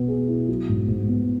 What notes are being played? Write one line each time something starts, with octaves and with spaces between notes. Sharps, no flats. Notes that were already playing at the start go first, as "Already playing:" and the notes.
Already playing: B2 B3
G#4
E4
F#3
G#2
G#2
B3